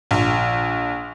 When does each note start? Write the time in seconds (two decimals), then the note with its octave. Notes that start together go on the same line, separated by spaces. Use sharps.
0.11 A#1